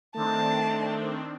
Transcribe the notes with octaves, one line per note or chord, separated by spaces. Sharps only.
D#3 A3 C4 D4 A5